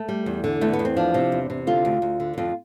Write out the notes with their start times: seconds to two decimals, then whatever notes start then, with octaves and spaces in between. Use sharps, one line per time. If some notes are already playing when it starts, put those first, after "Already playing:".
Already playing: A3
0.09 G3
0.26 E2
0.44 D3
0.61 E2 A3
0.73 B3
0.79 E2
0.85 C4
0.97 F3 D4
1.14 C3
1.32 E2
1.50 C3
1.67 D3 F4
1.85 D2
2.02 D2
2.20 D3
2.38 F2 F4